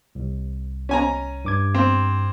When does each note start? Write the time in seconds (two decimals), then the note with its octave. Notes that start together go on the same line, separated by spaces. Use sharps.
0.15 C2
0.89 C#4 G#5 A#5
1.45 G2 D6 G#6
1.74 C4